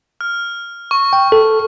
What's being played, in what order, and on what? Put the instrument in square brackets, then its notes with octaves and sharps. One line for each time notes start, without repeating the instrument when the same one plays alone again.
[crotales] F6
C#6
[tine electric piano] G5
A4